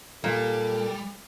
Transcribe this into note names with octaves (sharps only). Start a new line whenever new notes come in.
A#2 G3 A4